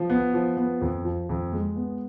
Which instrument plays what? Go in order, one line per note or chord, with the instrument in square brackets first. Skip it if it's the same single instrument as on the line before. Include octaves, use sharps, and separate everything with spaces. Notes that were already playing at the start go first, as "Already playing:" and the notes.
Already playing: [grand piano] F3
B3
F3
B3
F2
F3
F2
G#3
B3